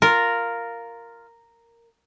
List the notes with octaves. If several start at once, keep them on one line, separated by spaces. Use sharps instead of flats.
F4 A#4